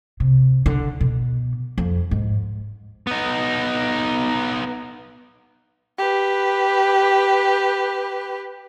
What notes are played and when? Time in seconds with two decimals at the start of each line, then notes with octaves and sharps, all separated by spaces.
0.20 C3
0.66 D3
1.01 B2
1.78 F2
2.11 G#2
3.07 B3 D#4
5.98 G4 B4